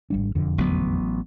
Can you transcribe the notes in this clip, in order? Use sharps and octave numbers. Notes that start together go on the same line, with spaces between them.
G#1 G3 D4
E1 F2 D3
A1 F#3 B3